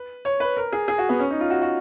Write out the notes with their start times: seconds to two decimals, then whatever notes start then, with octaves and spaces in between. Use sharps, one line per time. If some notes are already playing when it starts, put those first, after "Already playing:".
Already playing: B4
0.25 C#5
0.40 B4
0.57 A#4
0.72 G#4
0.88 G#4
0.98 F#4
1.09 B3
1.19 C#4
1.30 D#4
1.40 F4
1.50 F#4
1.62 F#4